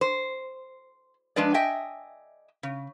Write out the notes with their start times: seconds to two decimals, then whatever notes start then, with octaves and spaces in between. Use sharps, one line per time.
0.01 C5
1.36 F3 G#3 D4 B4 D5
1.54 D#5 E5 G5 G#5
2.63 C#3